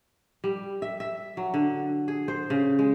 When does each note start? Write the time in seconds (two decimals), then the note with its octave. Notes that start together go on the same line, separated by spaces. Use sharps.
0.44 G3
0.82 E5
1.00 E5
1.37 F#3
1.54 D3
2.08 G#4
2.28 C5
2.50 C#3
2.79 G#3